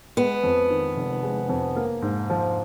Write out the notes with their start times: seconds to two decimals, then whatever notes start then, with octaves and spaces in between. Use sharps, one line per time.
0.17 G#3 B3
0.43 F2
0.70 D#3
0.96 F1
1.23 G#3
1.49 F2
1.76 A#3
2.02 G#2
2.30 F3